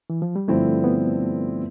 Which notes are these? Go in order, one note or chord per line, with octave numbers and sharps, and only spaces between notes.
E3
F3
G3
G2 D3 F3 A3 C4 E4
B3